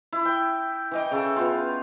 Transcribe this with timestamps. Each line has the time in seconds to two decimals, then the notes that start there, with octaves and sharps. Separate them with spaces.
0.13 E4
0.25 G5
0.91 E3 D#5 G5
1.11 C#3 A4
1.36 B3 F4